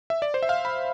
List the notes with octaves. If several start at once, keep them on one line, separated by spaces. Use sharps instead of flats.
E5
D5
C5
E5
F5
B5